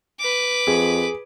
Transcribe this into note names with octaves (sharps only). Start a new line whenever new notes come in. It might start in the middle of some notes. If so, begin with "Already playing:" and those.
B4 D6
F2 G#4